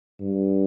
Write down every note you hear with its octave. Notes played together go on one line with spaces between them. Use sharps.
G2